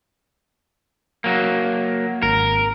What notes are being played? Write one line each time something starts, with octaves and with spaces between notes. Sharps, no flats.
F#3 A#3
G#1 A#4